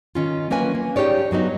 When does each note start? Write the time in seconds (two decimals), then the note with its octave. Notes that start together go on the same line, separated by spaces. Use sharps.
0.15 D#3 C#4 F4
0.50 F#3 A#3 C#4 B4 G#5
0.75 A#3
0.96 D#4 G4 G#4 C#5 D5
1.31 G2 F#3 B3 D#4